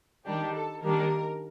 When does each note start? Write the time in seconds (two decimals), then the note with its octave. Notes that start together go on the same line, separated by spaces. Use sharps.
0.26 D#3 G3 D4 G4
0.54 A4
0.82 D#3 G3 A#3 D4 A#4